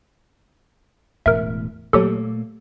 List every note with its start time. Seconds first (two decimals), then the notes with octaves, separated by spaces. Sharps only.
1.26 E1 A2 A#4 E5
1.93 A#2 F#3 A3 A#3 G4 A4